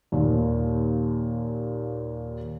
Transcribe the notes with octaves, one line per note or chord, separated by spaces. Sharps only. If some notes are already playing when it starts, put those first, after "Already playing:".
D#2 A#2